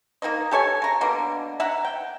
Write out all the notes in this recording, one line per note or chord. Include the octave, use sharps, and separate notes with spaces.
A#3 C#4 D#4 D#5
G4 A4 C#5 G#5
C#3 A#5
B2 D3 A#3
E5 F#5 A#5
G5